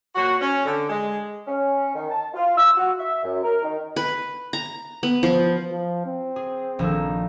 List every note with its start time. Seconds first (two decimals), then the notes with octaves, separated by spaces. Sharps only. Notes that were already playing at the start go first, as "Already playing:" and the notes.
0.15 A#2 F#3 F#4
0.41 C#4
0.65 D3
0.89 G#3
1.47 C#4
1.95 D#3
2.10 A5
2.33 F4
2.56 E6
2.76 F#4
2.97 E5
3.22 F#2
3.42 A#4
3.62 D#3
3.96 B4
4.53 A#5
5.03 B3
5.23 F3
5.72 F3
6.05 C4
6.36 G#4
6.79 A#1 D#3 A4